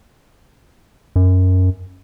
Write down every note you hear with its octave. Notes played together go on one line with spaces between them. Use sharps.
F#2